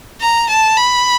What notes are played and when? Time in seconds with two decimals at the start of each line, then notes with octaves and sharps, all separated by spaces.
0.20 A#5
0.49 A5
0.77 B5